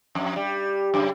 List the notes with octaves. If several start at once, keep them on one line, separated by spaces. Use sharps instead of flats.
F2
G3
F#2 C#3